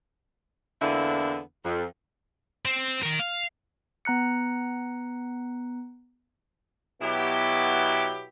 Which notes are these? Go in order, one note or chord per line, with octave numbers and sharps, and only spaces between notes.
E2 D3 A#3 B3 D4 E4
F2
C4
D#3 A#4
F5
B3 A#5 F#6 C#7
B2 F#3 B3 E4 G4